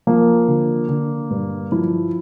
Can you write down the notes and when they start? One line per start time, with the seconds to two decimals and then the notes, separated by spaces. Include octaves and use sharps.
0.07 F3 A#3
0.48 D3
0.89 D3
1.30 G2
1.72 F3 E4